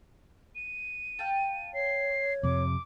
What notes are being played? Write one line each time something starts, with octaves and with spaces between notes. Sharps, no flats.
D#7
F5 G5 A5
C#5 C7
F2 C3 D6